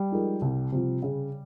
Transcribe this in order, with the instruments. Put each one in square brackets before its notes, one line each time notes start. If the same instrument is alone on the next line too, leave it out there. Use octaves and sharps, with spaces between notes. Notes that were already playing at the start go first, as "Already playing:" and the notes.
Already playing: [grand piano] G3
[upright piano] F3 G#3 D#4 A#4
C2
C3 F3
C#3